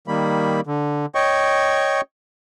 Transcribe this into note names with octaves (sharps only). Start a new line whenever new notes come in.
D#3 G3 A#3 B5
D3
C#5 D#5 G5 C#6